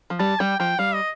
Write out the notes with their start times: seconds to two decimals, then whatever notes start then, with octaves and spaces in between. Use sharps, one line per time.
0.10 F3
0.19 G3 A5
0.40 G3 G5
0.59 F3 G5
0.79 G3 F5
0.94 D#5